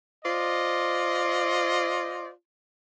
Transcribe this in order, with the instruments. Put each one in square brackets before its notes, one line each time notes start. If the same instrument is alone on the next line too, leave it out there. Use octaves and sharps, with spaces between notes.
[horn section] F4 C5 D5 D#5